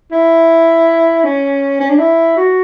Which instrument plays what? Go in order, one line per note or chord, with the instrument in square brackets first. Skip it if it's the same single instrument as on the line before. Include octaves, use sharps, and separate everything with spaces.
[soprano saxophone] E4
C#4
C#4
D4
E4
F#4